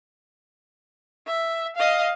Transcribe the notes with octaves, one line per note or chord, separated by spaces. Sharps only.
E5
D#5 F5